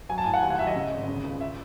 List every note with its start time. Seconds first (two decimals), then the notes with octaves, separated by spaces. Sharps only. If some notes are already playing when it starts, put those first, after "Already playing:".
0.09 F#3 G#5
0.18 A5
0.25 A2 G#5
0.34 F#5
0.42 D#2 G#5
0.50 F#5
0.59 F#3 E5
0.67 D#5
0.75 C#3
0.91 G#1
1.08 C#3
1.24 C#2
1.41 E5